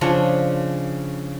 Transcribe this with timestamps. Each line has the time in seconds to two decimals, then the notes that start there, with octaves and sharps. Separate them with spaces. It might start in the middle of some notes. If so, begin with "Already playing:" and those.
0.01 C#3 F3 D4 C#5